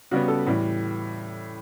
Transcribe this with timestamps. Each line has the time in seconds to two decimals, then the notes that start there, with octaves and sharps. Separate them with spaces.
0.11 C#3 G3 B3 F#4
0.28 A4
0.47 A2 E3 G3